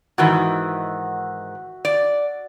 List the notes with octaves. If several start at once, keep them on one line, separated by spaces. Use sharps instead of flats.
G#2 D#3 E3 F#4 E5
D5